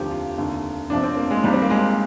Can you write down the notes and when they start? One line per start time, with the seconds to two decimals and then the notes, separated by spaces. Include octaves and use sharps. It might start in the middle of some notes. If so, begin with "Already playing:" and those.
Already playing: F1 D#2 D3 F3 G4
0.11 F4
0.37 F1 D#2 D3
0.90 G1 F2 C3 F3 D4
1.03 C4
1.17 A#3
1.31 G#3
1.44 G#1 G#2 F3 G3
1.53 C4
1.62 A#3
1.70 G#3